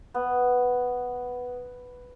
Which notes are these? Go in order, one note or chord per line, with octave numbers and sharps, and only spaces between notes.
B3